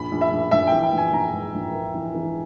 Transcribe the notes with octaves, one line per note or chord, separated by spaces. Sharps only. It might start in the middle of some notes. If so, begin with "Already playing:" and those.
Already playing: A#1 B5
A#1
E5
A#1
A#1 E5
G5
E3
G5
A#1
G#5
A#1 A#5
G#2
A#1
A#3
E3
E3